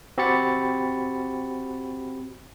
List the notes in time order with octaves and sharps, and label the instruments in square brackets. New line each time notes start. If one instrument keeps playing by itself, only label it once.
[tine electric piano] C4 F#4 G4 B5 A6 C#7